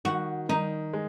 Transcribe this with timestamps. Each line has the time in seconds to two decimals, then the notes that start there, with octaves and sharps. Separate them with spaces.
0.05 D#3 F#4
0.49 D#3 D#4
0.93 G#3